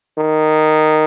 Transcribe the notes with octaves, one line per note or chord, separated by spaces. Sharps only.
D#3